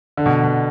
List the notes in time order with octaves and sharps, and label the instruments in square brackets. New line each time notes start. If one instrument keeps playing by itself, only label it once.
[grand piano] D3
B2
B2